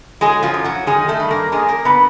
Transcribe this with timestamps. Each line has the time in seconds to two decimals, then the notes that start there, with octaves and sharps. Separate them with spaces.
0.21 F#3 G#3 G#4
0.43 F3 F4
0.54 F#2
0.64 F#3 F#4
0.87 D#3 G#3 G#4
1.08 A3 A4
1.20 G2
1.31 A#3 A#4
1.52 F#2 G#3 G#4
1.68 A#3 A#4
1.85 D3 B3 B4